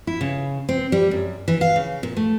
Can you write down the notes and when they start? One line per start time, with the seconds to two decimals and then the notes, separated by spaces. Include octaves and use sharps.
0.07 E4
0.21 C#3
0.69 C4
0.92 G3
1.11 F#2
1.48 E3
1.61 F5
1.76 C#3
2.03 A#2
2.17 A3